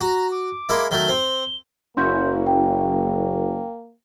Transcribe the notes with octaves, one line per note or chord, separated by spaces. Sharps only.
F#4 A#5
D6
G#3 A#3 E4
D#3 F#3 A3 G7
C4
F#1 A#3 C#4 E4 F#4 C6 G6
G5